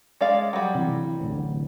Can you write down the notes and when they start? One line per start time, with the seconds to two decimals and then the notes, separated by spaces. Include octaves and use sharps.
0.21 G#3 D5 F5
0.53 F#3 G3
0.75 C3 E3
1.21 D1 A1 D2